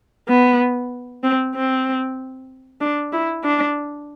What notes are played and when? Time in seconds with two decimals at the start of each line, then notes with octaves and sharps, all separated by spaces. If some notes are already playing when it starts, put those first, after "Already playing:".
0.28 B3
1.23 C4
1.54 C4
2.81 D4
3.13 E4
3.44 D4